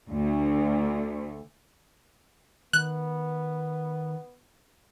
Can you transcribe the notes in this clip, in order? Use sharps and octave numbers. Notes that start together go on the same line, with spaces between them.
D2
D#3 B3 F#6